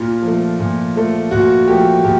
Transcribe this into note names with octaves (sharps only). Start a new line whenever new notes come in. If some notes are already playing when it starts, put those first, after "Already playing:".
Already playing: A#2 F4
F3 A3
A#2
F3 A3
A#2 F#4
F3 A3 G4
A#2 G4